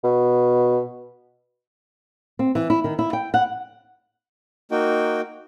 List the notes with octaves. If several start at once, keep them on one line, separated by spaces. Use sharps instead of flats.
B2
C4
E3
E4
D#3
E4
G5
F#5
A#3 D#4 F#4 G5